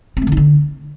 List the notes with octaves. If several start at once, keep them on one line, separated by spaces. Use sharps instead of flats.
C4
A3
D3
D#4
D3